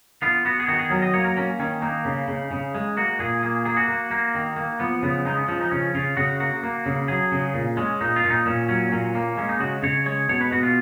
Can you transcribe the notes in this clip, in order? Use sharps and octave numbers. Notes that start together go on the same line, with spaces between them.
B3 F4
B3 F#4
G#4
D#3 F#4
G#4
F#3 A#4
D#5
A#3 C#5
A#4
A#3 C#4
D#3 C#4
A#3 D#4
C#3
C#3
C#3
G#3
A#3 F#4
A#2 G#4
A#3 G#4
A#3 G#4
F#4
A#3
A#3
D#3
A#3
F3 B3
C#3 B3
G#3 D#4
B3
F3 C#4
D#4
C#3 C#4
C#3 F4
C#3 F#4
A#3 F#4
A#3
C#3
F#3 G#4
C#3
A#2
G#3 C#4
A#2 D#4
F4
A#2 C#4
D#4
A#2 C#4
F#3 C#4
A#2 C#4
A#3
G#3 C#4
D#4
C#3 F#4
C#3 C#5
G#3 C#5
B2 C#5
B4
B2 F#4
F4